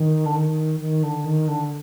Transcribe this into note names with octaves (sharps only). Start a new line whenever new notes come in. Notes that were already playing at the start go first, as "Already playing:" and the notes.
Already playing: D#3
D3
D#3
D#3
D3
D#3
D3